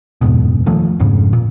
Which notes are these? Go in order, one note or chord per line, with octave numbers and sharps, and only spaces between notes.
F#1 E2 G#2 B2
C3 D#3 F3 A3
G#1 F2 G#2 C#3
A#2